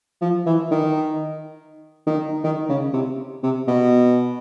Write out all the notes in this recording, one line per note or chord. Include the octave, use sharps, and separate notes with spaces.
F3
E3
D#3
D#3
D#3
C#3
C3
C3
B2